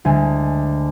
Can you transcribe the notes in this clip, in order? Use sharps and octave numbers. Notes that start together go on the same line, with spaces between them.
D2 D3 G#3 G#5